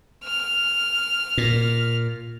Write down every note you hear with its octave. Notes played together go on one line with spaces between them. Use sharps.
F6
A#2